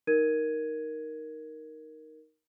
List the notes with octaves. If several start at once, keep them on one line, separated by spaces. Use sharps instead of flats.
D#4 A#4 G#6 D#7